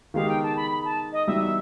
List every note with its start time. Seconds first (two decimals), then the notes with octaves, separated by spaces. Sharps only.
0.14 D#3 G#3 B3 D#4 G4 F5
0.29 G5
0.43 A5
0.56 B5
0.71 B5
0.85 A5
1.13 D#5
1.27 E3 G3 B3 D#4 F#4 E5
1.41 E5